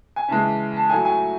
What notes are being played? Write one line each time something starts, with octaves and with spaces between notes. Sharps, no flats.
G#5
C#3 E3 G#3 A5
A5
A2 F#3 A3 G#5
G#5